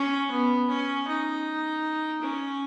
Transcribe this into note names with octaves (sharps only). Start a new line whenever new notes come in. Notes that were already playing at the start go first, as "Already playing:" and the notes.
Already playing: C#4
B3
C#4
D#4
C#4